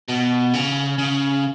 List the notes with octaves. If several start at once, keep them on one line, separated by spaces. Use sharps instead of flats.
B2
C#3
C#3